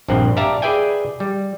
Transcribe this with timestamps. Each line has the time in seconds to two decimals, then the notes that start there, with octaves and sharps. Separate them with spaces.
0.08 A#1 G2 F3 C4 F#5
0.37 G4 D5 E5 F5 A5 A#5
0.62 G#4 B4 D5 E5 G5 G#5
1.20 G3